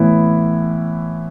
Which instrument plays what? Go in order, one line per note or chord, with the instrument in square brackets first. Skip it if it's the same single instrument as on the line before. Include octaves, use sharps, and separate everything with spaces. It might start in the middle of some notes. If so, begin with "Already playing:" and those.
Already playing: [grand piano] A2 E3 B3 E4 B4